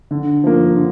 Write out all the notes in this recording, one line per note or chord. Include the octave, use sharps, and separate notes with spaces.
D3
F3 A#3
D3